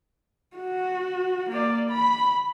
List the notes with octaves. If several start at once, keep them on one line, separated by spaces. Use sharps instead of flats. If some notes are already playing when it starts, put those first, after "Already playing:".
F#4
A#3 D5
B5